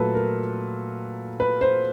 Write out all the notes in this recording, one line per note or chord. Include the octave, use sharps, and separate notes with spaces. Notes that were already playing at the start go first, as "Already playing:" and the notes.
Already playing: A#2 F#3 A3 A4 B4
A#4
B4
C5